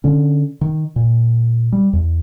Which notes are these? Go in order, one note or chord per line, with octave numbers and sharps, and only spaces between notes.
D3 C#4
D#3
A#2
G3
E2